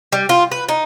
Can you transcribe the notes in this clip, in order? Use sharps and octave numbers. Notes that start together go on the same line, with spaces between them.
G3
F4
B4
D#4